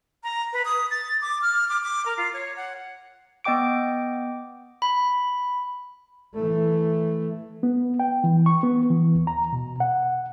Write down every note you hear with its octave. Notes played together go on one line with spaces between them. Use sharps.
A#5
B4
D#6
A6
D6
F6
D6
D6
A#4
F4
C#5
F#5
B3 D#5 G5 D6 D7
B5
E3 A3
B3
G5
E3
C#6
B3
E3
D#2
A#5
B2
F#5